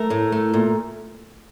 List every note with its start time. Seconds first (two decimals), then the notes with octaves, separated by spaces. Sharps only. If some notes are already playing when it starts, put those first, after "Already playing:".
Already playing: A3 A#4
0.10 A2
0.32 A3
0.54 A#2